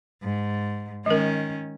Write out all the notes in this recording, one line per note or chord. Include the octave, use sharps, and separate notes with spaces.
G#2
D#3 G#3 C#4 A#4